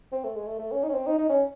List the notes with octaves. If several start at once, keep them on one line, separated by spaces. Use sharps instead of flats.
C4
A3
G#3
A3
A3
C#4
D#4
C#4
C4
D#4
D#4
C#4